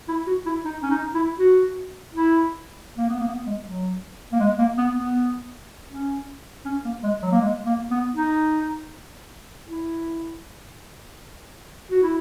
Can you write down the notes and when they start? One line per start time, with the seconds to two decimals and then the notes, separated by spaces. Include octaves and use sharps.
0.08 E4
0.27 F#4
0.46 E4
0.65 D#4
0.83 C#4
0.90 D#4
1.14 E4
1.39 F#4
2.15 E4
2.97 A#3
3.09 B3
3.19 A#3
3.28 B3
3.47 G#3
3.65 F#3
4.32 A#3
4.40 G#3
4.59 A#3
4.78 B3
4.97 B3
5.90 C#4
6.65 C#4
6.85 A#3
7.03 G#3
7.22 F#3
7.32 A#3
7.41 G#3
7.66 A#3
7.91 B3
8.16 D#4
9.66 E4
11.91 F#4
12.03 E4